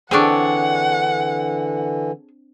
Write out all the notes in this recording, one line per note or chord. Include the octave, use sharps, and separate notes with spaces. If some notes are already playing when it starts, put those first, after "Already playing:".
D3 E3 C4 D4 G#4 A4 C#5 F#5